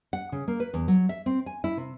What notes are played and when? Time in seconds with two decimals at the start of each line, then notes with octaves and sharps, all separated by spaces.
0.13 F#5
0.32 C#3
0.48 A#3
0.60 B4
0.74 E2
0.88 F#3
1.09 E5
1.26 C4
1.46 G#5
1.64 E4
1.77 C3